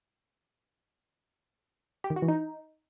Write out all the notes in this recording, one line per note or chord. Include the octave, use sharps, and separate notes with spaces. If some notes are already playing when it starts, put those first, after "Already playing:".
G4
D#3
F#4
E3
D#4